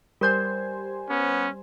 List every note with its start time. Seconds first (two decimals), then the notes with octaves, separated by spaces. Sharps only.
0.21 G3 A#4 C5 G#5 G6
1.09 B3 C#4